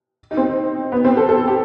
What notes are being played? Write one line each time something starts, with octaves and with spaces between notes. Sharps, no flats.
D#4
C4
B3
C4
A4
A4
G4